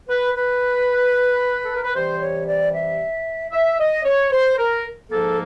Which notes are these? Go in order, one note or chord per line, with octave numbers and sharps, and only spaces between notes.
B4
B4
A4
A#4
B4
C3 E3 G3 C5
C#5
D5
E5
E5
D#5
C#5
C5
A#4
G#2 F3 A#3 A4